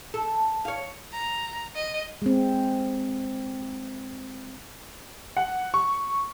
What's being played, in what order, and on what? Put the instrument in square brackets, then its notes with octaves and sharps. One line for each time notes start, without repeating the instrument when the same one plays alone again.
[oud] A4
C#5 F5
[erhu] A#5
D#5
[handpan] G#3 C4
[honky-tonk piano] F#5
C#6